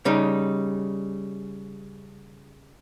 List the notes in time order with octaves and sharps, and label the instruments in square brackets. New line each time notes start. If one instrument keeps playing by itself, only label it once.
[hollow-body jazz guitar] C#3 G3 D#4